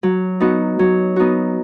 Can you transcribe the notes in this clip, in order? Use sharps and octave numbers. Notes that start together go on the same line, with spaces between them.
F#3
B3 D#4 F#4
F#3
B3 D#4 F#4